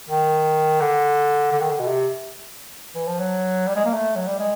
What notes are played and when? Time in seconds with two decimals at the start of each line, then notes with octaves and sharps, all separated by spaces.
0.09 D#3
0.80 D3
1.52 D3
1.60 D#3
1.70 D3
1.79 B2
1.88 C3
2.95 E3
3.08 F3
3.19 F#3
3.67 G3
3.76 G#3
3.85 A#3
3.94 A3
4.15 F#3
4.27 G3
4.39 G#3